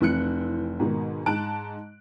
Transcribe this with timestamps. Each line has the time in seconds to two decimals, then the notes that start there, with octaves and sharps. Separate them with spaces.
0.01 F1 E3 C4 F#6 C#7
0.80 G#2 B2 D#3
1.26 G#2 D#4 A5 F#6 D7